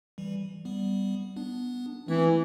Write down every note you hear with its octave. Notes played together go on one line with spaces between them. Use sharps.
E3 G3
G3 B3
B3 D4
E3 A3 C4